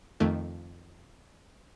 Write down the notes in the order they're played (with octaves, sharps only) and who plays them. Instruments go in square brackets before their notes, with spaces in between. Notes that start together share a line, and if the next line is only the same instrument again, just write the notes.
[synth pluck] F2 D#3 A3